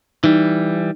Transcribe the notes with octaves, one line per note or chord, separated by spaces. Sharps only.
E3 G3 D#4